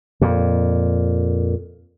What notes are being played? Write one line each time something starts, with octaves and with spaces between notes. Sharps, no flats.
F2 A#2